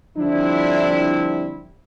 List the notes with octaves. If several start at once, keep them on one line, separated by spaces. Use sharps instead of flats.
D3 F3 G3 C4 D4 E4